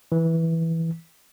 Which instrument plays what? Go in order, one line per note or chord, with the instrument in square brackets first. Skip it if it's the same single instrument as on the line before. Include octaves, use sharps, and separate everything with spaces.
[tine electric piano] E3